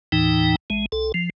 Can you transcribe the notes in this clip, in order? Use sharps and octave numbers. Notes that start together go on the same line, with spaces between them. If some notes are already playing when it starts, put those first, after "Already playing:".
D#2 A2 E3 D#4 G5
A1 G#3
C2 A4
F3